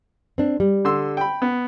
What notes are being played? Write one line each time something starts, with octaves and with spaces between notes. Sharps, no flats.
C4 D4
G3
D3 C6 E6
G5 B5
B3